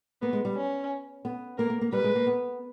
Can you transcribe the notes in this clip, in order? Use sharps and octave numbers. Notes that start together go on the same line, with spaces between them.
A#3 B3
G#3
G3
C#4
B3
A#3 A#4
A#3
A#3
G3 B4
G#3
A#3
B3